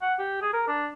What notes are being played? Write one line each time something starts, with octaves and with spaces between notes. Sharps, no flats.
F#5
G4
G#4
A#4
D4